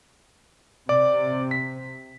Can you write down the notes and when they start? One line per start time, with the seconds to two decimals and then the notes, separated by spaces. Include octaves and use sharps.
0.89 C3 D5 D6
1.51 B6